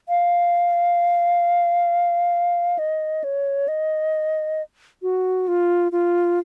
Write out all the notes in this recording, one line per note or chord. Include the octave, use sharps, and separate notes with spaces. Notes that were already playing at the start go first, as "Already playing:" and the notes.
F5
D#5
C#5
D#5
F#4
F4
F4